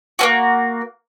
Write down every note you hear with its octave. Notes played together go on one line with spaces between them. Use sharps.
A#3 C#4 F#4